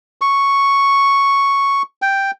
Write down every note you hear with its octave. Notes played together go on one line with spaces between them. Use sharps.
C#6
G5